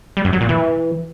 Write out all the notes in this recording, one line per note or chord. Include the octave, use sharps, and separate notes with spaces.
G3
F#2
F#3
A#2
E3